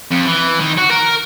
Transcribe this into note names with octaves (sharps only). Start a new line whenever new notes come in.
F2
E3
D#3
F#4
A#4